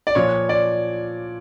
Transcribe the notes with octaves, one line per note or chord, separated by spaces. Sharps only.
D5
A#2 F3 C#5
D5